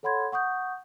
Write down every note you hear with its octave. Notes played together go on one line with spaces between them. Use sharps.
A4 C#5 F#5 B5 C6 G#6
F#5 C#6 D#6 G6